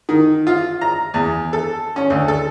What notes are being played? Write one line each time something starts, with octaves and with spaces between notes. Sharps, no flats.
D#3
F4
A#5
E2
A4
C#4
D2
A4